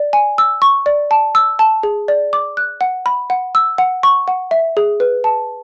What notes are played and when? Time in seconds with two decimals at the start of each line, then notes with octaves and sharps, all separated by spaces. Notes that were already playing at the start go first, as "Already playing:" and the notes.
Already playing: D5
0.13 G#5
0.38 E6
0.62 C#6
0.86 D5
1.11 A5
1.35 E6
1.59 A5
1.83 G#4
2.08 D5
2.33 D6
2.57 F#6
2.81 F#5
3.06 B5
3.30 F#5
3.55 E6
3.78 F#5
4.03 C#6
4.28 F#5
4.51 E5
4.77 G#4
5.00 B4
5.24 A5